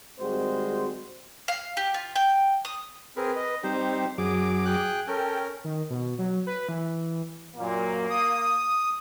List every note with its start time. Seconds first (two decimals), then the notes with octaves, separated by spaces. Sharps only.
0.20 G#1 G3 G#3 C4 F#4 C5
1.48 F5
1.77 G4
1.94 F4
2.16 G5
2.65 D#6
3.17 C4 G#4 A#4 B4
3.36 D#5
3.64 G3 C4 D#4 G4 C5
4.18 F#2 F#3 G#4 D6
4.65 G#4 G5 F#6
5.08 C#4 A4 A#4 G5
5.64 D#3
5.90 B2
6.19 F#3
6.47 B4
6.69 E3
7.56 F#2 A#2 A#3
8.10 D#6